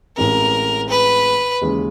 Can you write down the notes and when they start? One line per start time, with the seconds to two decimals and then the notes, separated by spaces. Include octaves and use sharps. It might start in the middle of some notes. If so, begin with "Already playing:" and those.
0.17 A1 A2 E3 G#3 C4 A#4
0.89 B4
1.61 D#2 C#3 E3 G#3